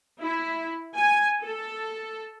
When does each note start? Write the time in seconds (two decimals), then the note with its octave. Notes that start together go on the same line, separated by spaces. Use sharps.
0.21 E4
0.96 G#5
1.43 A4